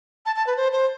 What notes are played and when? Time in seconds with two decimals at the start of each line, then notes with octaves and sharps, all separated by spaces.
0.26 A5
0.36 A5
0.47 B4
0.57 C5
0.72 C5